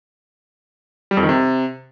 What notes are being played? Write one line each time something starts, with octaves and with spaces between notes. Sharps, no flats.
G3
F2
D#3
C3